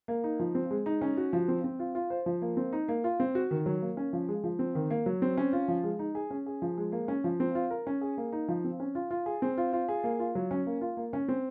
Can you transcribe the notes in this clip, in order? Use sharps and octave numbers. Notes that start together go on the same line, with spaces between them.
A#3
D#4
F3
C4
G#3
D#4
C#4
F#4
F3
C4
C4
F4
F4
C5
F3
A#3
C4
D#4
A#3
F4
C4
F#4
D#3
F#3
A#3
C#4
F3
G#3
F3
C4
D#3
A#3
F#3
C4
C#4
F4
F3
G#3
D#4
G#4
C#4
G#4
F3
G#3
A#3
C#4
F3
C4
F4
A#4
C#4
G#4
A#3
D#4
F3
C4
C#4
F4
F4
G#4
C4
F4
F4
G#4
A#3
F4
F#3
C#4
A#3
F4
A#3
C#4
C4